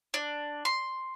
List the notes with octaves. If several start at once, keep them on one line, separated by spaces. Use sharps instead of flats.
D4
C6